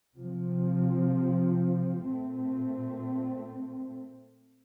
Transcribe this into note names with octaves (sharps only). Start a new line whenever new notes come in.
C3 F3 C4
A#2 A3 C4